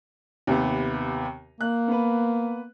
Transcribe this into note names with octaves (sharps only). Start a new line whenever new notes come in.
D#2 C3 B3
A#3 F#6
B3 B4